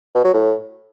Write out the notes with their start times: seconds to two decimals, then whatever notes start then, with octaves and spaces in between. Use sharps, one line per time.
0.15 B2
0.24 F#3
0.34 A2